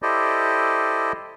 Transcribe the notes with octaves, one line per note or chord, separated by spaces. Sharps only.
E4 G4 A4 C5 D5 D#5